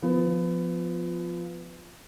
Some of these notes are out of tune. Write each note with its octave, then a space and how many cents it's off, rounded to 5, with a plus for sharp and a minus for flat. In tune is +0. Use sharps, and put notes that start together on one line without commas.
F3 +0 B3 +25